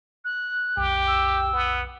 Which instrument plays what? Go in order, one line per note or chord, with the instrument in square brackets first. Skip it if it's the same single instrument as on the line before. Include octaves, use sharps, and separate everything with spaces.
[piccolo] F#6
[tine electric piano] B1 F2 [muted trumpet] G4
[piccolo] E6
[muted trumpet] B3